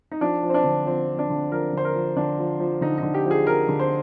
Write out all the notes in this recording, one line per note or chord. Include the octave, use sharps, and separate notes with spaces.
D#4
F3 D4
F3
C4
D4
D3
F3 C4
F3
D4
D3
F3 A#4
D3 C5
A#4
F3
D3 D4
F3
F3
D3 D#4
D3 D#4
G4
F3
G#4
F3 A#4
D3
C5